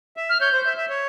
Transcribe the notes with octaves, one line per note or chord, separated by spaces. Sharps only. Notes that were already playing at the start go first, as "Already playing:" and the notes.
E5
F6
C#5 G6
C5
E5
E5
C#5